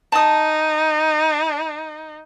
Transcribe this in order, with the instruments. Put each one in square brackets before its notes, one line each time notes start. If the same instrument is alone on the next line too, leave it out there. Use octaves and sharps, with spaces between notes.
[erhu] D#4 [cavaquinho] A5 D#6